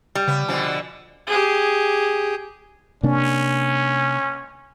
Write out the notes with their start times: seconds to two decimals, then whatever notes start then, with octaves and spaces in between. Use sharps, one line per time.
0.15 G3
0.27 C#3 B3
0.49 B2 D3 F3 G#5
1.27 G4 G#4
3.03 C3 A#3 C#4 D4